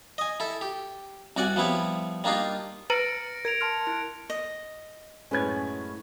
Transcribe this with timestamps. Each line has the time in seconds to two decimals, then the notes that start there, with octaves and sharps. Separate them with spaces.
0.18 D#5 G#5
0.40 E4 A4
0.61 G4
1.36 C2 F#4 D5 F#5 G#5
1.56 F3 G3 B3 E4 C#5
2.24 G3 A#3 D4 D#4 F4
2.90 B4 A#5 F6 A6 A#6 C#7 D7
3.45 A#4 G#6 D7 F7
3.61 A5 C6 F6
3.87 E4
4.30 D#5
5.31 F#2 A2 G#3 C#4 B4 G#6